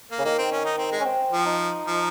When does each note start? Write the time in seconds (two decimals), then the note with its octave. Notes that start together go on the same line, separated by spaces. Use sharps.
0.11 A#3
0.19 C#3
0.25 D#3 A#3
0.39 C4
0.52 C#4
0.65 D#4
0.78 C4
0.92 G#3
1.00 C#4
1.06 C4
1.33 F3
1.46 D#4
1.87 F3